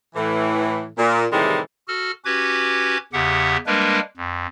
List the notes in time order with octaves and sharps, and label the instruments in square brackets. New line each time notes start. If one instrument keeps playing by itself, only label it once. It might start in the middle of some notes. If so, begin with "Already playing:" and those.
[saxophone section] A2 E3
A#2
A2 C3 D#3 E3 G3 G#3
[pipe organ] F#4 A4 F6
C#4 F#4 G4 B4 D6 G#6
E2 C#3 G4 E5 F#5
G3 G#3 A#3 D4 A#4 B4
F2